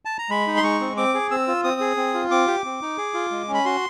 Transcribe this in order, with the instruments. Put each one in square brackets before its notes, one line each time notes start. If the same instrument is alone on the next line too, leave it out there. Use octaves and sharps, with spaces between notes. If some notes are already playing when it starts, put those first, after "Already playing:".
[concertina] A5
A#5
G#3 B5
D#4
C6
G#3 C#6
C4
C4 D6
G#4
C4 E6
F4
C4 D#6
G#4
C4
F4
C4 D6
G4
C4
D#4
G#4
F4
G#3
C#4
B5
F#4 C6